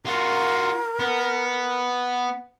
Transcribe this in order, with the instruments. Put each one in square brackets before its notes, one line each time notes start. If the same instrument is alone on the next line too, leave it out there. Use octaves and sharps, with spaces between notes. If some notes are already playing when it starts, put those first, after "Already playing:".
[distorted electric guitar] F4 F#4 [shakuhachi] A#4
[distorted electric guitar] B3